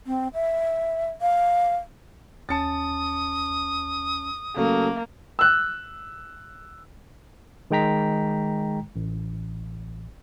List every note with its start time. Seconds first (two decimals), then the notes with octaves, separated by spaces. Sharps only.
0.07 C4
0.34 E5
1.21 F5
2.49 D#2 C#4 A5 D#6 A6 C#7
4.56 C#3 F#3 A3 A#3
5.39 E6 F#6
7.71 D#3 G#3 G5 A#5 B6
8.96 A1